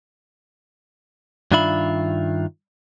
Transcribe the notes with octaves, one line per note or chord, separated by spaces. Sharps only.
G2 D#3 D4 F4 E5 B5